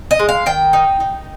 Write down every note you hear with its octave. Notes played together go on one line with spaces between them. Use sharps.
D#5
G#3
F5
D#3 G5
D#4
D#4